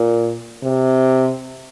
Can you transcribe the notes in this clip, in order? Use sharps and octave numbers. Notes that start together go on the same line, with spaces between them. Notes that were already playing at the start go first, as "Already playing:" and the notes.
Already playing: A#2
C3